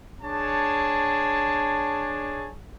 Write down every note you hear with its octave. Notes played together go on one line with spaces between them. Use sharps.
D4 G#4 C#5 A5